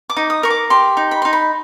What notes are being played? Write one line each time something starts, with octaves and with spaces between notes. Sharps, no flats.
D6
D#4
D#6
A#4 C#6
D6
G4 C6
D#4
B5
D#4 C6
B5